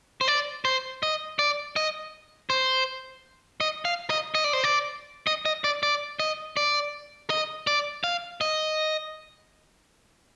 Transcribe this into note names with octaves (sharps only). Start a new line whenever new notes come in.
C5
D5
C5
D#5
D5
D#5
C5
D#5
F5
D#5
D#5
D5
C5
D5
D#5
D#5
D5
D5
D#5
D5
D#5
D5
F5
D#5